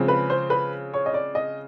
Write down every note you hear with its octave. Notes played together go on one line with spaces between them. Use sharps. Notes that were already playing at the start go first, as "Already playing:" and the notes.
Already playing: C#3 F3 G#3 C4
B4
C5
B4
C#5
D#5
D5
D#5